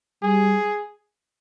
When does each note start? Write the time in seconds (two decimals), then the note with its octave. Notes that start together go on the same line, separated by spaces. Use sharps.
0.22 G3 G#4